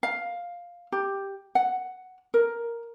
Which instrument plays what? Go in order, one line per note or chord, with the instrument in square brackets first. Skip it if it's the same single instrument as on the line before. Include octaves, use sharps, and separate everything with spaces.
[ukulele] F5
G4
F#5
A#4